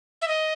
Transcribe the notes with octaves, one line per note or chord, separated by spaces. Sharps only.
E5
D#5